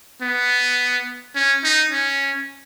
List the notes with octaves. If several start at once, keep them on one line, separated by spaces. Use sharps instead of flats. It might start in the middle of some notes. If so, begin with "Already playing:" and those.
B3
C#4
D#4
C#4